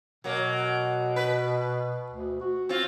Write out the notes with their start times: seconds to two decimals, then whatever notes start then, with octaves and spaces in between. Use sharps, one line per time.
0.24 B2 F#3 A#3
1.16 B4
2.12 D2
2.41 F#4
2.69 C4 F4